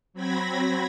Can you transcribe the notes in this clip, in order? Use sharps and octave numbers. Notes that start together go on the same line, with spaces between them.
F#3 C4 B5 G#6 A#6